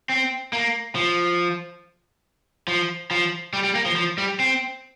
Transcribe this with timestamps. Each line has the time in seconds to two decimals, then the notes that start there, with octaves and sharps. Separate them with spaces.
0.09 C4
0.53 A#3
0.96 F3
2.68 F3
3.11 F3
3.53 G3
3.64 G3
3.75 A#3
3.86 F3
3.96 F3
4.18 G3
4.40 C4